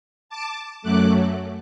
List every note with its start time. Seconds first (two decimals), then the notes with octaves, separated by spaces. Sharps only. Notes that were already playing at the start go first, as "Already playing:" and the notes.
0.29 A5 D6
0.82 F#2 F#3 A3 D6 F#6